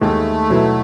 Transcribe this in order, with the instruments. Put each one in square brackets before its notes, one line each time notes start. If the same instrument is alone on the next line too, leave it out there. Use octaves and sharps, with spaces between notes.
[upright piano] D#2 D#3 G#3 [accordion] A3
[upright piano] B2 F#3 B3 E4